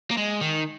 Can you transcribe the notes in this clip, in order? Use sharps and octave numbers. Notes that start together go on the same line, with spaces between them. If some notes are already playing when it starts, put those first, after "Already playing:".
A#3
G#3
D#3